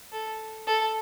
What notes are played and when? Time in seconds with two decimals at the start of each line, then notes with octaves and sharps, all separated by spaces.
0.12 A4
0.67 A4